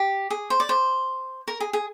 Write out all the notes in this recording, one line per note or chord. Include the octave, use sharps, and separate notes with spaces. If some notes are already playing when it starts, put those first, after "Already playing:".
Already playing: G4
G#4
C5
D5
C5
A#4
G#4
G#4